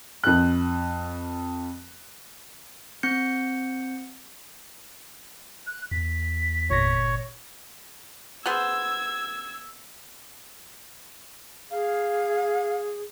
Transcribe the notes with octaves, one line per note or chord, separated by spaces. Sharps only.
F2 F#6
C4 G6 C#7
F#6
E2 B6
G1 A#2 C#5 A#6
B3 G#4 C5 E6 G#6
G#4 F5